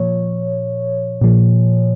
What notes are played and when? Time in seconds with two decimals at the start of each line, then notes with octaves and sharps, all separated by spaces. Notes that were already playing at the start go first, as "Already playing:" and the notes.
Already playing: A#2 F3 C#5
1.21 A#2 F3